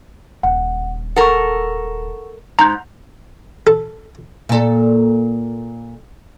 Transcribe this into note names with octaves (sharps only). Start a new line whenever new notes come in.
D#1 F#5
A4 A#4 F#5 A#5 C#6
G#2 A#5 G6
A4
A#2 A4